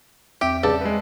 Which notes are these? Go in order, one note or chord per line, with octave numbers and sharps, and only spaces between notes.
E2 C4 G4 E5
G2 C#3 A4 D5
G#3 B4